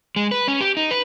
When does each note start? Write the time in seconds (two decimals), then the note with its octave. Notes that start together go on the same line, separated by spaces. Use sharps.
0.16 G#3
0.31 B4
0.48 C#4
0.61 G4
0.77 D#4
0.91 B4